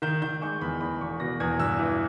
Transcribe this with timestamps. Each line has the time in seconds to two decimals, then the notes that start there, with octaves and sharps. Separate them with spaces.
0.02 D#3 G6
0.22 D#3 G6
0.42 G#3 C#6
0.61 E2 B5
0.81 E2 B5
1.00 E1 C#6
1.20 B2 A#6
1.40 E2 G#6
1.60 G2 E6
1.79 E3